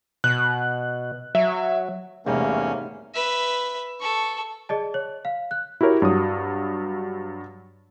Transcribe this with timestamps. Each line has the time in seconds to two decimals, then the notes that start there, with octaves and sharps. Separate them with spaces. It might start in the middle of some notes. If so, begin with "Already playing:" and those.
0.24 B2 F#6
1.35 F#3 E5
2.26 E2 G#2 C3 G3 A3 A#3 C#4
3.14 B4 E5
4.00 A4 C#6
4.69 G#4 D5 D#5 A5
4.94 C#5
5.25 F5
5.51 F#6
5.81 E4 F#4 G4 A#4 C#5
6.02 G2 F#3 D#6